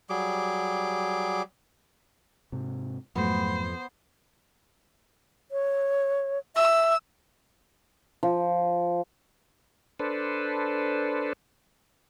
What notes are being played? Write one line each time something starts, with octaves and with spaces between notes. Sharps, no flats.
F#3 G3 G#4 D6
G#2 C3
F2 G#2 F#3 A3 B3 C5
C#5
E5 E6
F3
D4 A4 B4 C5